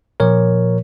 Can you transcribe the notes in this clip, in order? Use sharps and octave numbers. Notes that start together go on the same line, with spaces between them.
A#2 F3 A#4 C#5